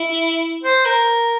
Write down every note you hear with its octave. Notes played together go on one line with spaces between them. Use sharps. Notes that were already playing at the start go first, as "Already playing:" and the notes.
Already playing: E4
C5
A#4